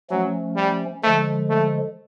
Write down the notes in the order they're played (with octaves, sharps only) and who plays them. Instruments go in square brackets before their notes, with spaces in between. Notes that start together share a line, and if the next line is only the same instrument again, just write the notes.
[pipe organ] F3 A3 C#4 [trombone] F#3
[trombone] G3
[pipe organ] D3 F3 G#3 [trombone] A3
[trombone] A3